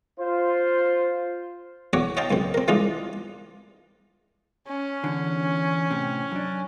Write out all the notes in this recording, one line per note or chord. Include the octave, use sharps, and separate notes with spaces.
F4 C5
E2 F#4 C#5 F#5 D6
C#5 D#5 F5 G5 A5 C6
C#2 F#2 C4
C4 A#4
E3 G3 G#3 D4 D#4 F4
C#4
E2 D3
A2 C3
F#2 D4